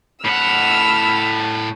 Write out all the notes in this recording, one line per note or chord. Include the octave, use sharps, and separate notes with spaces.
A2 F#5 B5 E6 F6